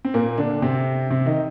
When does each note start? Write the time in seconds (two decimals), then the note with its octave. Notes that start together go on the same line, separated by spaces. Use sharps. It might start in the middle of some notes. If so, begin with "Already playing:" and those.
0.05 C4
0.14 A#2 A#3
0.38 D3 D4
0.62 C3 C4
1.10 C3 C4
1.26 D#3 D#4